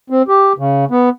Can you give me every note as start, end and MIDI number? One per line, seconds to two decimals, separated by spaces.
0.10 0.22 60
0.28 0.53 67
0.58 0.85 49
0.91 1.09 59